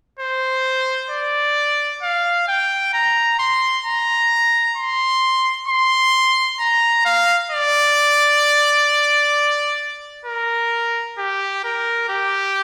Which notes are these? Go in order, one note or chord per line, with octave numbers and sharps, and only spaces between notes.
C5
D5
F5
G5
A#5
C6
A#5
C6
C6
A#5
F5
D5
A#4
G4
A#4
G4